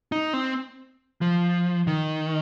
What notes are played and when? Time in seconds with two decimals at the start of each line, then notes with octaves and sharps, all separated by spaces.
0.12 D#4
0.33 C4
1.21 F3
1.87 D#3